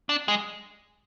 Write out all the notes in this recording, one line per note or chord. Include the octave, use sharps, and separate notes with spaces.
D4
G#3